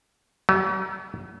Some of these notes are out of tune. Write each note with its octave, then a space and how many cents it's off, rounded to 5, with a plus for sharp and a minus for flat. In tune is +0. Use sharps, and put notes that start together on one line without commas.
F#3 +45